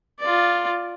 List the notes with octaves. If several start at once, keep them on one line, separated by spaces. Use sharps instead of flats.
F4 D5